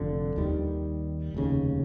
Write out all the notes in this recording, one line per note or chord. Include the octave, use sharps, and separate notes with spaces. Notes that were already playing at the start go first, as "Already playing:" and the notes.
Already playing: F1 F2 D3
D#2 D#3 G3
F1 D#2 C#3